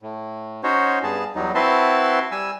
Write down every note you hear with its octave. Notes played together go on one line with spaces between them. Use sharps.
A2
C#4 D#4 F#4 C5 C#5
G2 B3 G#4 A5
E2 F#3 G3 D#4
C4 E4 F#4 B4 A5 C6
G3 G#5 E6